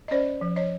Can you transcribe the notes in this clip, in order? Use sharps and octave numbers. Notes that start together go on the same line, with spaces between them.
D#5
C#4 C5 D5
F3
C#5 D#5